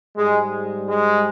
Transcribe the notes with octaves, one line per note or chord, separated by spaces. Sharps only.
G#2 G3 G#3
G#3